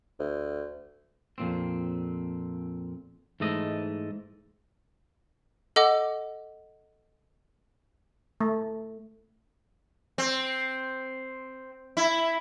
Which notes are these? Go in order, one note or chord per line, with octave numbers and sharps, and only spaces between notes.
D2
F2 A#2 C4
G#2 E3 A3 D#5
A4 D#5 F#5 D6
A3
C4
E4